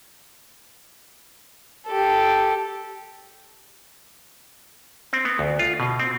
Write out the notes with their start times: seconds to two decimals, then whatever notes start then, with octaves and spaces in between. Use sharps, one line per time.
1.87 G4 A4
5.13 C4
5.25 B3
5.39 D2
5.59 F4
5.80 B2
5.99 C4